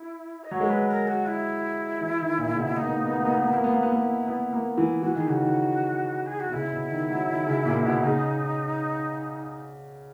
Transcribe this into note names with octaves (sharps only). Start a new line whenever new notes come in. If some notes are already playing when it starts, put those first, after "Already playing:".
Already playing: E4
D#5
F#3 C#5
G#3
F#3 B4
A#4
F#4
E4
E3
D#3
A#2
C#3
B2
A#3 D#4
B3
A#3
B3
A#3
B3
A#3
B3
A#3 E4
B3
A#3
B3
A#3
B3
A#3
E3
E3 F#4
D#3 G#4
C#3 F#4
D#3
G#4
F#4
B2
C#3 E4
B2
D#3
F#3
D#3
C#3
A#2
B2
C#3 D#4